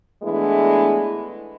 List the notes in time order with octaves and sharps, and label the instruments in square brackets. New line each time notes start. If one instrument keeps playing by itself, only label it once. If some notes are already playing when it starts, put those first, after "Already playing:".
[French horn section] E3 G#3 A3 B3 D4 E4